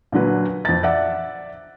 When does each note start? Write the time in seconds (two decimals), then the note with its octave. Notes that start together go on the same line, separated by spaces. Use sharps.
0.12 A#2 D3 F#3 B4
0.65 F2 A6
0.83 D5 E5 F#5